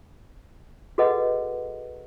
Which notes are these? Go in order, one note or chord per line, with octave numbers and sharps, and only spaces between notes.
F#4 G#4 A4 B4 D#5 F#5